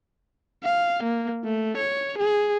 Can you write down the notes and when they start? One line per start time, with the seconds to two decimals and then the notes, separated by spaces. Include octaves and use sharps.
0.63 F5
1.03 A#3
1.44 A3
1.77 C#5
2.18 G#4